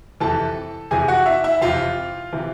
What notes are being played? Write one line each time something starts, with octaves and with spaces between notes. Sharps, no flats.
F2 C3 E3 A4 A5
F2 C3 E3 G#4 G#5
F#4 F#5
E4 E5
E4 E5
F2 C3 E3 F4 F5
C3 E3